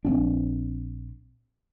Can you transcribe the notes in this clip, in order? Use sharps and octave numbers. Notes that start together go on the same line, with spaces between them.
A#1 C4 D4